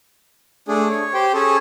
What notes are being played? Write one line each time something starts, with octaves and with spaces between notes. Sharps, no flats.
A3 D4 G#4
C#5
G4 C5 G5
C#4 G#4 A4